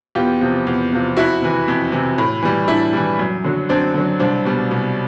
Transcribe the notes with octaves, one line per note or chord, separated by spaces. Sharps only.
E2 F4 G4
C3 F3
E2
C3 F3
F2 E4 F#4
C3 E3
F2
C3 E3
A2
E3 G3
A2 D4 E4
E3 G3
F#2
D3 F#3
F#2 C4 D4
D3 F#3
C2 C4 D4
B2 G3
C2